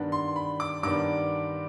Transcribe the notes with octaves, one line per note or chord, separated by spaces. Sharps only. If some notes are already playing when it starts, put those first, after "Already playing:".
Already playing: G2 D#3 B3 D4
C6
B5
D6
G2 D#3 B3 D4 D6